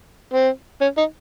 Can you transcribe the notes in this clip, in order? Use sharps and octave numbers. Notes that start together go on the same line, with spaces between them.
C4
C#4
D#4